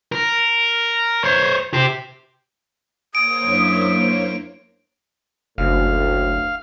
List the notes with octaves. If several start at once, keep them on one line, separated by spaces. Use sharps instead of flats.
A#4
C5 C#5
G4 C5
A#3 C5 C#5 D#6 D7
F#2 D4 E4
F#1 D2 A2 F5